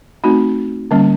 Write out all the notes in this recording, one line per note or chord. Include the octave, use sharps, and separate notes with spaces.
A3 C4 D#4 F#4
D3 G3 A#3 C#4